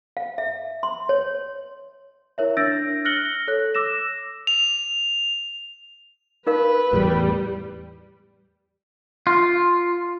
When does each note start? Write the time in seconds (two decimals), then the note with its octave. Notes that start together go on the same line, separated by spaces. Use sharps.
0.17 F5
0.38 E5
0.83 C6
1.09 C#5
2.38 E4 A#4 C#5 E5
2.57 D4 E6 G6 A6 A#6 D7
3.05 F6 F#6 A#6 C#7 F#7 G7
3.48 A4 C#5 F#6
3.75 D6 E6 A#6 E7
4.47 F7
6.47 D#4 A#4 B4 F5
6.93 E2 A2 G3
9.27 F4